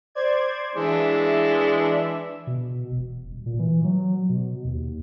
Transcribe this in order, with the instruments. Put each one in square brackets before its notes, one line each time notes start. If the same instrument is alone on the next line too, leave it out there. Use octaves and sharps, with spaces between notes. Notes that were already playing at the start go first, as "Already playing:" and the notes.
[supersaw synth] C5 D5 G#6
[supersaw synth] E3 E5 [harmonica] G#3 D4
[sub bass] B2
E1
D#1
A#2
E3
F#3
B2
D#2